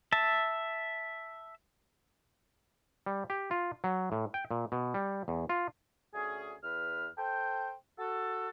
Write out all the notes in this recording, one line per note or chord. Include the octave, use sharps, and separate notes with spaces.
E5 A5
G3
G4
F4
F#3
A2
G5
A#2
B2
G3
E2
F4
D2 C#4 G#4
E2 B4 F6
A4 C5 G5
F#4 A4